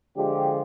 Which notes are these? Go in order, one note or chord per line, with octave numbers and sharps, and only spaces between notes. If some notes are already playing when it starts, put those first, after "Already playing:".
D3 F3 G#3 G4